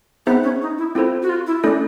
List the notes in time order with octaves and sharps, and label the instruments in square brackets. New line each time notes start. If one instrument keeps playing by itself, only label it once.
[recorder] B3 [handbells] C4 D#4 G#4 C5 E5
[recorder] C#4
D#4
E4
[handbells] C4 F4 A4 C5 [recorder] E4
[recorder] F#4
F4
E4
[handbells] A3 C#4 E4 A4 [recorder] D4